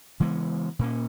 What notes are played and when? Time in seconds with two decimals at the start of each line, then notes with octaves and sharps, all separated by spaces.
0.20 C#3 E3 G#3 B3
0.79 A#2 A#3 C#4